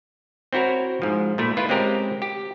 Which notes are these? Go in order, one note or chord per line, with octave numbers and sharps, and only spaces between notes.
C4 E4 F#4 A#4 C#5
G#2 F3
A#2 A3 E4
E4 F4 B4
G#3 C4 C#4 G4 A#4
G4